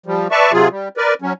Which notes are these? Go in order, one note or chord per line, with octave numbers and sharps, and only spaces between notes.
F3 G3
B4 D5 E5 A5 C#6
C3 F#3 F4 G#4
G3
A#4 B4 D5
F#3 C#4